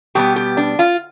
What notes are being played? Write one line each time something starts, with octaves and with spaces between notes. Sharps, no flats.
B2 G3 B3 G4
G4
D4
F4